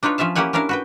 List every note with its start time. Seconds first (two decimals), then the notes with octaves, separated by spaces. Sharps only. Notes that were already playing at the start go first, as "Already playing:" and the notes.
0.03 D4 D#4 F4 B4 C#5
0.18 F3 C#4 E5 F5 A5
0.35 A#3 C#4 E4 G4 F#5 G#5
0.53 C#4 D4 E4 A#4 F5
0.69 F#4 B4 G5